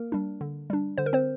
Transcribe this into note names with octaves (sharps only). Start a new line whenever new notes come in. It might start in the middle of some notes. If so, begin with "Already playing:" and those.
Already playing: A#3 A#4
G3 D4
D3
G3 D4
D3 C5
A#4
C4 C5